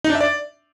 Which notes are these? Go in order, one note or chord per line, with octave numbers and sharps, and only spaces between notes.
D#4
D4
E5
D5